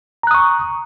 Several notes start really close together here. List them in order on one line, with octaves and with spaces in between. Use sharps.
A#5 F#6 D#6 C#6